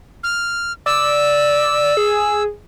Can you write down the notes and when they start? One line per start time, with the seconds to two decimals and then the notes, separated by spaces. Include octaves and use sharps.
0.23 F6
0.86 D5 E6
1.97 G#4